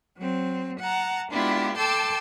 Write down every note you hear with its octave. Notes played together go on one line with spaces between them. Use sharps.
F#3 C4
F#5 A5 A#5
G#3 B3 D4 E4 F4 G4
A4 G5 A5 C6 D6 E6